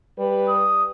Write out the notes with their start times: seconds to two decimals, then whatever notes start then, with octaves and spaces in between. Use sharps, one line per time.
0.18 G3 G4 B4
0.48 D#6